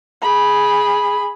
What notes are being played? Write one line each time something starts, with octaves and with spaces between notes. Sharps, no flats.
G#4 B5